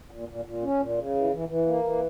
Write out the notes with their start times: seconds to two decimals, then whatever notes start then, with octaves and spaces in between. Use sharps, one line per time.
0.11 A#2
0.29 A#2
0.45 A#2
0.62 C#4
0.80 A#2
0.98 C#3
1.15 E3
1.32 E3
1.49 E3
1.67 A#3
1.83 E3